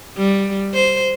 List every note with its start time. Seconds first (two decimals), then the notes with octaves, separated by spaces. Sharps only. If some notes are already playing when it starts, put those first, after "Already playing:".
0.18 G3
0.74 C5